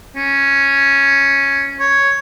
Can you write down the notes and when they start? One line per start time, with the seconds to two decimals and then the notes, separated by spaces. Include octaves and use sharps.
0.16 C#4
1.79 C#5